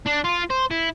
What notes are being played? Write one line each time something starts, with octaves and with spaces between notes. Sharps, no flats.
D4
F4
C5
E4